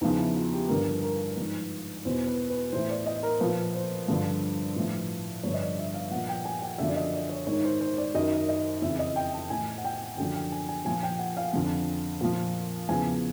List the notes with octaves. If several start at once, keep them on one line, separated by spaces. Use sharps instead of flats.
E2 C#3 F3 D#4
E4
F4
G4
G2 D3 F3 A#4
A#4
G#2 F3
E2 B2 C5
B4
B4
A2 E3 C5
D5
D#5
A#4
A#2 F3 B4
C5
G2 D3 F3
A2 F3
G2 D3 F3 C#5
D#5
D5
E5
F5
A#2 F3 F#5
G5
G#5
G5
F#2 D3 F3 E5
D5
D#5
D5
C#5
G#2 D#3 C#5
C5
C5
D5
F#2 D#3 D#5
D#5
F2 C#3 E3 E5
D#5
G5
A5
A2 E3 G#5
F#5
G5
F#2 D3 F3 G5
G5
G#5
G#5
A#2 F3 G#5
G5
F#5
F5
F2 D3 F3
A#2 F3
E2 C#3 F3 G#5